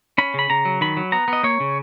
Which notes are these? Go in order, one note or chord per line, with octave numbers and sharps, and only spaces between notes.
C#4 B5
C#3 B5
C#3 A#5
F#3
D#3 B5
F#3
B3 A#5
B3 D#5
A#3 C#5
C#3